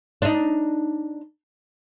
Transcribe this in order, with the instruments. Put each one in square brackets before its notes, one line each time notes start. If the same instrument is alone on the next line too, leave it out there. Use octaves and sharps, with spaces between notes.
[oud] D4 D#4